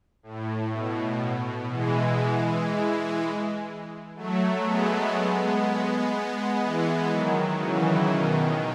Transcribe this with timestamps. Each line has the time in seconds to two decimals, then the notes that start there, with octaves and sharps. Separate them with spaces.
0.23 A2
0.72 B2
1.69 E3 G#3
4.15 F#3 A3
4.65 G#3 B3
6.60 E3 G#3
7.10 D#3 F#3
7.59 C#3 E3
8.09 B2 D#3